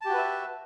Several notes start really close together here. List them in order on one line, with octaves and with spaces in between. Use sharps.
A5 G4 F#4 B4 E5